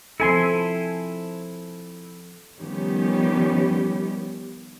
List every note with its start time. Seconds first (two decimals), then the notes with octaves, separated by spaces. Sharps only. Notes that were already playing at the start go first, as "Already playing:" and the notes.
0.20 F3 C4 E4 A4 G#5 C6
2.58 D#3 F3 G3 B3 C#4 G4